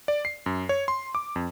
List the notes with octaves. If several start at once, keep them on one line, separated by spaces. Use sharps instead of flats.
D5
C7
F#2
C#5
C6
D6
F2